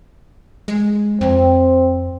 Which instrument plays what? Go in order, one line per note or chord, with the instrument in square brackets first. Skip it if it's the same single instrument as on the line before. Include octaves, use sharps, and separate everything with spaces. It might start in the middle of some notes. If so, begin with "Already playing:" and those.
[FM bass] G#3
[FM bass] F2 [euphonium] C4